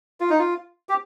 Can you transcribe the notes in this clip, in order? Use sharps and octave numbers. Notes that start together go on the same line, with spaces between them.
F4
D#4
F4
G4